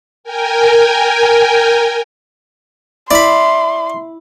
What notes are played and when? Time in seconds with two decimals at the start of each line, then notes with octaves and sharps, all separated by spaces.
0.24 A#4 G5 G#5
3.11 E4 D5 B5 C6